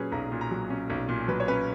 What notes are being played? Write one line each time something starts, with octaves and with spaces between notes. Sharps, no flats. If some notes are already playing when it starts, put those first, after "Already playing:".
Already playing: A#2 F#3 C#4 G#4 B4
B1 A#5
A#2
A#5
F#3
C#4
B1
A#2
F#3 B4
C#5
C#4 B4